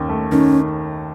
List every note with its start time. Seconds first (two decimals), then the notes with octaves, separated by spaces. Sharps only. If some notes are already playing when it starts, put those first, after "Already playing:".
Already playing: D#2 D#3 C#4
0.09 A3
0.32 D#3 C#4